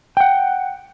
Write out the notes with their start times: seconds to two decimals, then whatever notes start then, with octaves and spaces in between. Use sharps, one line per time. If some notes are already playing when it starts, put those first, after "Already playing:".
0.17 F#5 G5